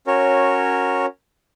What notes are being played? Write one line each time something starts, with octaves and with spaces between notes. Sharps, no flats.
C#4 F#4 A#4 C#5